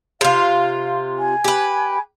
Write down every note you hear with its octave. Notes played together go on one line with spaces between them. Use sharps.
C3 F4 F5
G#5
G4 B4